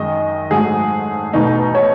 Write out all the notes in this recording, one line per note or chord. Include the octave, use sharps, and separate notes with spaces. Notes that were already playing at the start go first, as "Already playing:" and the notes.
Already playing: F#2 D#3 G#3 D#5
G#2 F#3 A3 G#4
E2 B2 A3 D#4
C#5